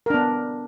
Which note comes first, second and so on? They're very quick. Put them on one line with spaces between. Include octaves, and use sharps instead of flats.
A#4 D4 B3